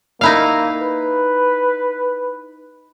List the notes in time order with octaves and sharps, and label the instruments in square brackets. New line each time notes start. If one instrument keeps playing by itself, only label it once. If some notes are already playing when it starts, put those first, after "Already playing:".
[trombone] A#3 [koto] D#4 E4 F5
[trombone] B4